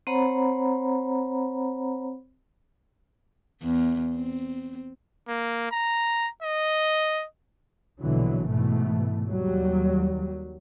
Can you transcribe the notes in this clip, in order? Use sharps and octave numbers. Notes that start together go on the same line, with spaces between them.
C4 C5 C#5 F#5 A#5 B5
E2
C4
A#3
A#5
D#5
A#1 B2 D3 E3 F#3
G#2 B2 E3 A3
D#2 F#3 G3